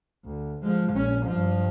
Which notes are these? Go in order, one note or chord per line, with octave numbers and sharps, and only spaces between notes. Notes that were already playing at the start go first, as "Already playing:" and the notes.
D2
F3 G#3
A#1 C#4
G2 F3